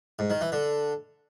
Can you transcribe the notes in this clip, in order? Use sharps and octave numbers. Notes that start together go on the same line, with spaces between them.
G#2
D#3
E3
D3